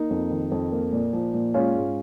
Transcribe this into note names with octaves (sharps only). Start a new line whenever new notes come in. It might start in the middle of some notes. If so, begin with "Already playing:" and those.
Already playing: A#3 D#4
F2
D#3
F2
A#3
A#2
F3
A#2
G#3 C#4 F4
G#2